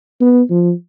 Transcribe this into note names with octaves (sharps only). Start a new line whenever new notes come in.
B3
F3